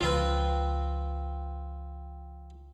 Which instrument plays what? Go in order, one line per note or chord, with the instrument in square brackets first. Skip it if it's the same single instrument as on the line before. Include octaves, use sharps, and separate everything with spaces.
[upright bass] C#2 [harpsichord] F3 C4 B4 [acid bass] F4